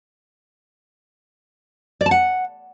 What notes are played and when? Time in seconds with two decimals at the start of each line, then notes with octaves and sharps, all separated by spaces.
2.01 D5
2.06 A5
2.11 F#5